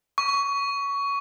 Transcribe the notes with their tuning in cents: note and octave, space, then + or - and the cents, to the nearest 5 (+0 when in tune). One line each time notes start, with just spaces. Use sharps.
C#6 +20